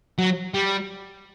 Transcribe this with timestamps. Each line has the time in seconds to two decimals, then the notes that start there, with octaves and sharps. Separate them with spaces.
0.18 F#3
0.54 G3